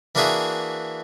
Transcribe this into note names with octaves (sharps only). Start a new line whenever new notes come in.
E3 A#3 D4 F#4 G#4 E5